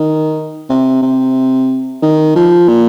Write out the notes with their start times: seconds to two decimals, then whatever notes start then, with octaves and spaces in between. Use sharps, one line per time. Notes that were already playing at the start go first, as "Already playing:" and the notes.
Already playing: D#3
0.69 C3
1.02 C3
2.02 D#3
2.36 F3
2.68 A#2